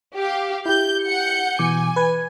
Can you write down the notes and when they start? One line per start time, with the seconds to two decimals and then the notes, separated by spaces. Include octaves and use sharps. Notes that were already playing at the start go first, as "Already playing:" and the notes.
0.16 G4 F5
0.66 E4 G4 G6
1.03 F#5 G6 C#7
1.59 B2 E3 G#5 D6
1.96 B4 G#6